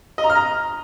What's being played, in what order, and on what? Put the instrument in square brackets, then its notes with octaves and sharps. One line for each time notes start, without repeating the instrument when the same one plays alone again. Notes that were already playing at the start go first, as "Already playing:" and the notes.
[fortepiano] D#5
A#5
F6
A#5